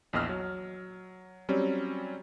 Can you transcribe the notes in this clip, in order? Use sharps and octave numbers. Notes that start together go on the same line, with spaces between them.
A#1 E2 D#5 E6 F6
F#3
F#3 G3 C4 C#4